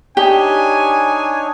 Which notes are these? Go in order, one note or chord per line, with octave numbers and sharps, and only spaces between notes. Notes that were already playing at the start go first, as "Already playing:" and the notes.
D4 D#4 G4 C#5 G#5